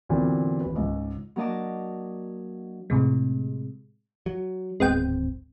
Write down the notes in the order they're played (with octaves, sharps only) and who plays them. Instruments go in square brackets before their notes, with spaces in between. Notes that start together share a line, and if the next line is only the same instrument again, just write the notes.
[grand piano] E2 A#2 D3 F#3 B3 C4
D#1 B4
C#2 G#2
[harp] F#3 A#3 D4 D#5 A5 D6
[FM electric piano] A2 C3 G#3
[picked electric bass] F#3
[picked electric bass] D1 G#1 C4 [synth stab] G#3 B3 G5